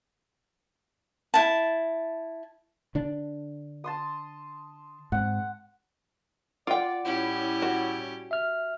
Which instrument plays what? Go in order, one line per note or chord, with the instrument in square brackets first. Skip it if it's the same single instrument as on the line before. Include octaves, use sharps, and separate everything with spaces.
[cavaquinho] E4 A5
[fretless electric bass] D3 D4
[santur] A5 C6 D#6
[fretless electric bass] G#2 C4 [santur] F#5
[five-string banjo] F4 G5 [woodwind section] D5 [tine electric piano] F#5 D6
[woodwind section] A2 G3 E4 [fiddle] C#4 G4
[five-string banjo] F#4
[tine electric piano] E5 F6